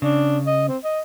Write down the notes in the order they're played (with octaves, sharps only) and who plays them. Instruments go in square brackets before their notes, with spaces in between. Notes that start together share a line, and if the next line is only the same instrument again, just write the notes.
[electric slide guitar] C#3 [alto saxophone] D4
[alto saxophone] D#5
C4
D#5